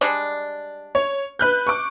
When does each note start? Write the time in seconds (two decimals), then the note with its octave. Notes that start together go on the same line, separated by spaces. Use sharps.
0.01 G3 G#3 D4
0.95 C#5
1.39 B4 F#6 G6
1.67 C#6 D6